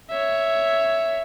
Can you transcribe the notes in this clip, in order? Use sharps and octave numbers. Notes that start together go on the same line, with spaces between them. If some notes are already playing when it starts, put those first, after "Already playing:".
C#5 E5